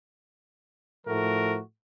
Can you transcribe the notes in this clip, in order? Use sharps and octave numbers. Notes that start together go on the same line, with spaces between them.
A2 F3 A3 F#4 A#4